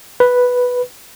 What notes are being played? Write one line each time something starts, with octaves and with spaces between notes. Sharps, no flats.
B4